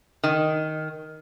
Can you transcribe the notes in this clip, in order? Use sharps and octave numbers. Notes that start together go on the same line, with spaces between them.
D#3